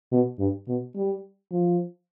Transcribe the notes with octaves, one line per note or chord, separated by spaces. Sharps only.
B2
G2
B2
G3
F3